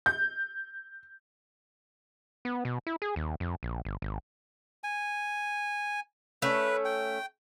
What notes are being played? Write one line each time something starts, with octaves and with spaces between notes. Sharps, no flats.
G6
B3
B2
E4
G#4
D#2
F2
A#1
G1
G#1
G#5
A3 C#4 B4
G5